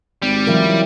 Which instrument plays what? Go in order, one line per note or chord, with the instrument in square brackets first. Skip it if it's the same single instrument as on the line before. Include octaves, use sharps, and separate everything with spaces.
[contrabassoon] G#1 [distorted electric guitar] G3
[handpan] C#3 E3 F#3 [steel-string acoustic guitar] E4 F4 A#4